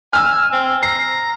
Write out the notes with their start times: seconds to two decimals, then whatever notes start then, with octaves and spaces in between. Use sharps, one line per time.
0.13 G#5 E6 F6
0.52 C4
0.83 A#5 C7